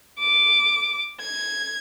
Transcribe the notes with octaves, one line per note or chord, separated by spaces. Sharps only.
D6
G#6